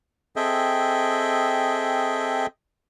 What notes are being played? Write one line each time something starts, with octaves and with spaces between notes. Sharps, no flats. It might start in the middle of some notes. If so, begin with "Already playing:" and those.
C4 G#4 A4 D#5 E5 G5